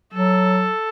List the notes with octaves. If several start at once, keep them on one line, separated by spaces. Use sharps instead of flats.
F#3 A4